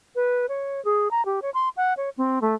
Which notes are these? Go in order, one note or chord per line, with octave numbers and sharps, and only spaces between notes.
B4
C#5
G#4
A#5
G4
C#5
C6
F#5
C#5
C4
A3